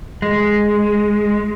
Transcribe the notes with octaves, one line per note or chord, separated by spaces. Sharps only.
G#3